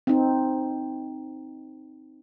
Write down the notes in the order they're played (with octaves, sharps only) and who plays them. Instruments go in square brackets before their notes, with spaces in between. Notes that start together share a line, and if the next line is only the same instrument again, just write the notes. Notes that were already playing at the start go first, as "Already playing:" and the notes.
[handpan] C4 D#4